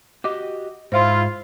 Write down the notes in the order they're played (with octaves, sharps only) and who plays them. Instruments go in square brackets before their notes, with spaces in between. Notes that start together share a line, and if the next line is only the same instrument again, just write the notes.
[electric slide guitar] F#4 G4 D#5 [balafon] D6
[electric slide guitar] G#2 [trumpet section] E4 F4 [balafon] C5 E5 C6